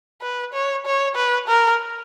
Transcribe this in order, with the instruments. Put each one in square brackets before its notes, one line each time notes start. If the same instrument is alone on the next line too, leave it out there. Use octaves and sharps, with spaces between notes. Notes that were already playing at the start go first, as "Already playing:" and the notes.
[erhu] B4
C#5
C#5
B4
A#4